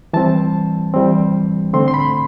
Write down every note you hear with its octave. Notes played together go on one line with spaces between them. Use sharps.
E3 G3 C4 A5
E3 G3 C4
D3 A3 C4 C6
C6
B5